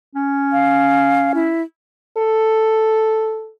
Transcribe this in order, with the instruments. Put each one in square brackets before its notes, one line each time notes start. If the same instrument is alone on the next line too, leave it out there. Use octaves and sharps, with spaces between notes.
[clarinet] C#4
[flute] F5
E4
[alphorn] A4